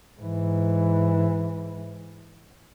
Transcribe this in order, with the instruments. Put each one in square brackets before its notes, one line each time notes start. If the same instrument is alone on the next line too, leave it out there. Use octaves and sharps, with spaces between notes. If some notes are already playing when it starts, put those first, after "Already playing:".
[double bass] G#2 E3